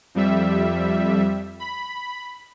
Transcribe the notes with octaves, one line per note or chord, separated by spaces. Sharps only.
F2 G3 E5
B5